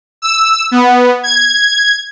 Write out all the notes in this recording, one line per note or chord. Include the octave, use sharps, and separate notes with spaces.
E6
B3
G#6